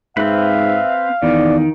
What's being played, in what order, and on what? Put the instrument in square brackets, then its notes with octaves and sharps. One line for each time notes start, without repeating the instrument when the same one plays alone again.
[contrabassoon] G#2 [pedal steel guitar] C4 B4 [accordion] E5 [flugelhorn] F5
[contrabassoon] E2 [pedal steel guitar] D#3 [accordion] D5